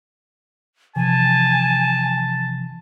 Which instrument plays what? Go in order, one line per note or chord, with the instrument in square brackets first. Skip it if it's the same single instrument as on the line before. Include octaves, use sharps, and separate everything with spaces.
[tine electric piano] C3 E3 F3 [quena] G#5 [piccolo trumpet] A5